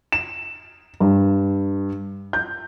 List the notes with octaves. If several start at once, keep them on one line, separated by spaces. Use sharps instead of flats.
E7
G2
G6